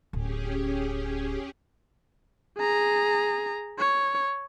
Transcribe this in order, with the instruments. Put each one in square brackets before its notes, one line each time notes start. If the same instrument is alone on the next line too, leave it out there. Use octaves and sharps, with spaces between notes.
[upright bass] D1 [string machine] C#4 G4 G#4
[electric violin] G#4 A#5
C#5